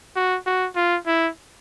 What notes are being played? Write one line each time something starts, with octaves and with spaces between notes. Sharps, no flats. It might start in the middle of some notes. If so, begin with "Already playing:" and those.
F#4
F#4
F4
E4